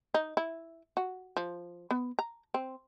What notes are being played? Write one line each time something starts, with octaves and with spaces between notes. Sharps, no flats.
D#4
E4
F#4
F3
B3
A#5
C4